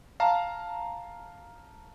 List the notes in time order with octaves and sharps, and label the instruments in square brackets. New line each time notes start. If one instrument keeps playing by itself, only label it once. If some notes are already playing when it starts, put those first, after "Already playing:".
[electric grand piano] F5 A5 A#5